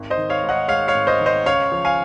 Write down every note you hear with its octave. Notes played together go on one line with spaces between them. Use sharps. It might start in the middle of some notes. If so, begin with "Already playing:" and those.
Already playing: G#1
C5 D#5
D#3
C#5 F5
G#2
D#5 F#5
G#3 C#5 F5
C#5 F5
G#1
C5 D#5
D#3
C5 D#5
C#2 C#5 F5
F3
F5 G#5